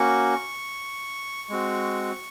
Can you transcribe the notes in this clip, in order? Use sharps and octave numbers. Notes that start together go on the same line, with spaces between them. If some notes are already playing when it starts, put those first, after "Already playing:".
Already playing: A#3 C#4 F#4 C#6
G#3 C4 F#4